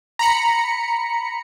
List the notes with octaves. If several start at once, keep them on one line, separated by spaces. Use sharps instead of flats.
A#5 B5 C#7